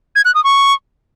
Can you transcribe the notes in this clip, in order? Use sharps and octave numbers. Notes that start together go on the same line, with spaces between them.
G#6
F#6
D#6
C#6